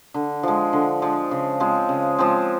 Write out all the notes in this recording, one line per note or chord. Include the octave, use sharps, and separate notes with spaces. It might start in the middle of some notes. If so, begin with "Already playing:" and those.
D3
F3 G#3
D3
F3 G#3
C#3
F3 G#3 C4
C#3
F3 G#3 C4